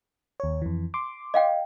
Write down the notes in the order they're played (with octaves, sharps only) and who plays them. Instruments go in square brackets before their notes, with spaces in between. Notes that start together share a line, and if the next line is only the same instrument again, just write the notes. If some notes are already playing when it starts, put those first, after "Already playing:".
[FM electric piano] D#2 C#5
F2 E3
C6 D6
[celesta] D#5 F5 G5